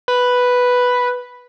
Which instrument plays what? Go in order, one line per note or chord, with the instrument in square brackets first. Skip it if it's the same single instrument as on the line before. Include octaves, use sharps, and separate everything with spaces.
[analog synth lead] B4